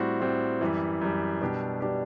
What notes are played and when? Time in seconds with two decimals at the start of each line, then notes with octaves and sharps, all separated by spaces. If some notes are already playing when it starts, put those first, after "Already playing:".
Already playing: A2 G3 C4 F#4
0.20 A2 G3 C4 F#4
0.61 F#2 E3 G3
1.01 F#2 E3 G3
1.41 B2 G3 D4 G4
1.80 B2 G3 D4 G4